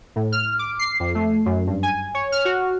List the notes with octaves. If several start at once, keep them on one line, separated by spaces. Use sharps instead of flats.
A2
F6
D6
C7
F2
A3
F#2
G2
G#5
C#5
F6
F#4